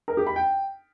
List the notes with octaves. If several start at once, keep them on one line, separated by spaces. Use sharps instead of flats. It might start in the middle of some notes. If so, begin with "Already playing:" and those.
A#4
G4
B5
G5